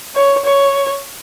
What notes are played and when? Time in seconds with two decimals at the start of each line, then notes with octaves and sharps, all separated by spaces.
0.15 C#5
0.45 C#5